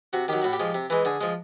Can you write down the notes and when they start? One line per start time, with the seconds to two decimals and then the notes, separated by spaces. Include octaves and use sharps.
0.13 C3 F#4
0.28 D#3 F#3 G4
0.42 A2 F#4
0.53 G4
0.60 F3 G#3
0.74 C3
0.90 E3 G#3
1.05 D3 G#4
1.21 F3 G#3